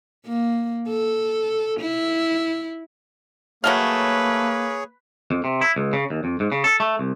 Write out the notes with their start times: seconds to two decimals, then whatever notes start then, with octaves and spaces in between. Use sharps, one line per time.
0.27 A#3
0.89 A4
1.80 E4
3.64 F#3 A3 A#3 G#4 B4 C#5 F5
5.31 F2
5.44 C3
5.61 E4
5.76 C#2
5.93 C#3
6.10 D#2
6.24 F2
6.40 G#2
6.52 C#3
6.64 A4
6.80 A3
6.99 C2